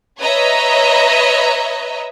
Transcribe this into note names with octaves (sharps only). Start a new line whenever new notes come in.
B4 C#5 D#5 E5 A#5